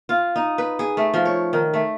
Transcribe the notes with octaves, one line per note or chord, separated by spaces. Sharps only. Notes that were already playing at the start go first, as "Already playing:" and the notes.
F4
D#4
B4
G#4
A3
F3
C#5
D#3
A3